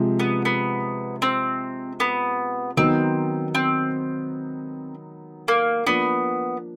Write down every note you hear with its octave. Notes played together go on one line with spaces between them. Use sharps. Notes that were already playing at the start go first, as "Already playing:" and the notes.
Already playing: C3 F3 G#3
B3
B3
C4
B3
D#3 F#3 B3 C4 D#4
C4
A#3
F3 A#3 B3 D4